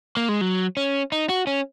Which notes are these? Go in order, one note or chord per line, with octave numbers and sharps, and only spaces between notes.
A#3
G#3
F#3
C#4
D#4
F#4
C#4